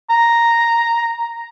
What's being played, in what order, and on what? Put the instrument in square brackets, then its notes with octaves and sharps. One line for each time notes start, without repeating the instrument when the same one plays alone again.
[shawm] A#5